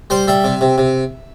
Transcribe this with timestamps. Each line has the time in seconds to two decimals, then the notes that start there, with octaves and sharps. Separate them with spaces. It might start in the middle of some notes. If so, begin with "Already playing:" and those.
0.10 G3 C5
0.28 G3 E5
0.44 C3
0.61 C3
0.78 C3